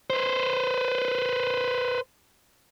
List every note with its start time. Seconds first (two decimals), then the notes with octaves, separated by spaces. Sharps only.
0.10 B4 C5